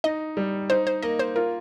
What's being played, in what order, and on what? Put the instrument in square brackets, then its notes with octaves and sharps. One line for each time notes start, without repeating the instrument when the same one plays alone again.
[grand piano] D#4 [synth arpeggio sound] D#5
[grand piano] G3
[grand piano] D#4 [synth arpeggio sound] C5
[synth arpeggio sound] C5
[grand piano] A#3 [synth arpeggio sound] D#5
[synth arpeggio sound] C5
[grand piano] F4 [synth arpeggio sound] A#4